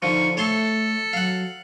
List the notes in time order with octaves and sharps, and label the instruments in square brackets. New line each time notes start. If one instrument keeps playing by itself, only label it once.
[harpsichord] D3 F3 [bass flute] D#4 [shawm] C#6
[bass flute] A3 [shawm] A4 [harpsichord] C#5 A5 C6
[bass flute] F#3 [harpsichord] F5 F#5